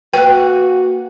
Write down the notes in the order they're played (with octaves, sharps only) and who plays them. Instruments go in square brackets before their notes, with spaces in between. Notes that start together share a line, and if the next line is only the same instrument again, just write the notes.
[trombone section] A#3 F#4 [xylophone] B4 F#6 [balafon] G5